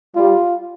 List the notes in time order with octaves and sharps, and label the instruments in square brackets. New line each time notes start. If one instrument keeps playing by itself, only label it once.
[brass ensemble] G3 [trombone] F4